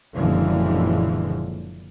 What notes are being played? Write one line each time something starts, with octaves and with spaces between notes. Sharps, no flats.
F#1 A#2 D3 E3 F3 G#3